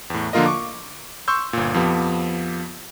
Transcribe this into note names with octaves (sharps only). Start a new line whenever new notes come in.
E2 A2
D3 F3 A#3 F4 A#4 D#5
C#6 D6
C6 C#6 E6 G6
G1 A#2
F2 F3 B3 G4